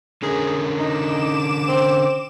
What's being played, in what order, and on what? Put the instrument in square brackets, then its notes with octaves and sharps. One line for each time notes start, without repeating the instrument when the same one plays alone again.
[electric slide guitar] D3 C#4 A#4 [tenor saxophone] G#4
[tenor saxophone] D#4 [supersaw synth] D6 E7
[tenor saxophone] C4